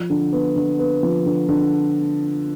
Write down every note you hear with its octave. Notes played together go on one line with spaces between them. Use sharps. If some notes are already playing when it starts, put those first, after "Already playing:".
Already playing: F3
D3
B3
D3
B3
F3
D3
D3